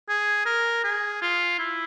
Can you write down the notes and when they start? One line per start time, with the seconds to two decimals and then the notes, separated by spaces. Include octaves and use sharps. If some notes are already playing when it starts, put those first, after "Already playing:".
0.09 G#4
0.46 A#4
0.84 G#4
1.22 F4
1.59 E4